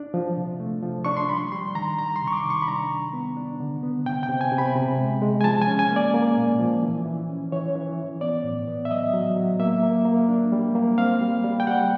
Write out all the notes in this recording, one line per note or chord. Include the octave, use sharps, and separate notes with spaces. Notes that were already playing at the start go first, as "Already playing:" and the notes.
Already playing: D4
F3
C3
A3
F3
D4 C#6
C6
G3 B5
G3 C6
D#3 A#5
G3 A#5
C6
C3
C#6
D6
D#3
C#6
B5
D4 A#5
G3
B3
D4
D3
B3
C3 G5
G5
C3
G#5
C3
B5
C3
G#3
G#3
G#5
F3 A5
G#5
C#4
G#5
A#3
D5
A#3
A#2
F3
E3
E3
C#4
E3 C#5
E3
E3
B3 D5
A2
B3
E5
F#3 D#5
F#3
F#3
A#3 E5
A#3
A#3
D4
G3
A#3
C4 F5
G3
G3
G5
G3 F#5